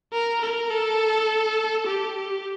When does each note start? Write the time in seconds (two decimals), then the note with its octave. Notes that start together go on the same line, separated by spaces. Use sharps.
0.13 A#4
0.42 A#4
0.70 A4
1.87 G4
2.16 G4